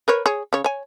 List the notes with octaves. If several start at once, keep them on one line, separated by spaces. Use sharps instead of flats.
A#4 B4 C#5
G#4 C#5
C#3 C#5
C#5 G#5